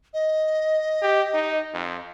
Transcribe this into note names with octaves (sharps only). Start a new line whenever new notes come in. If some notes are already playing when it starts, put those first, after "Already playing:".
D#5
G4
D#4
F2